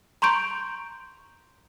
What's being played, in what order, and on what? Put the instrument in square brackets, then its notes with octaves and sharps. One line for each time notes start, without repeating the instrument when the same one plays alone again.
[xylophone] A#5 C6 C#6 G6 D7